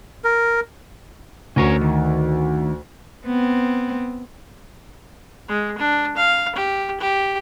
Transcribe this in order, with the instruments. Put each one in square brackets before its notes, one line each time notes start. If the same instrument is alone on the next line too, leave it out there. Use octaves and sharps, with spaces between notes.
[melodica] A#4
[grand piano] D2 [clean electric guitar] C#4 A#4 C#5
[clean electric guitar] D#3
[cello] B3 C4
[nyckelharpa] G#3
D4
F5
G4
G4